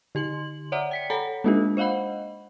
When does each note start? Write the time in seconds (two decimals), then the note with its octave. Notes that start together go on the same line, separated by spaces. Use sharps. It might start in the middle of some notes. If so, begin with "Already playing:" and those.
0.15 D3 G4 C6 F#7
0.72 C#5 D5 E5 F#5 A#5
0.91 G5 B6 C#7
1.10 A4 C#5 F#5 G#5 A#5 B5
1.44 G#3 A#3 D4 D#4 F4 G4
1.77 C5 D#5 F5 F#5 B5